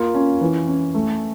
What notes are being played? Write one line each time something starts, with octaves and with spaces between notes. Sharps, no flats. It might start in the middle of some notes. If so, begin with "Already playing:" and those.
Already playing: A#3 F4
C#4
E3
C#4
A3